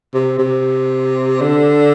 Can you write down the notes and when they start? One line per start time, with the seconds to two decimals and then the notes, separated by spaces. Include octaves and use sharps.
0.14 C3
0.39 C3
1.41 D3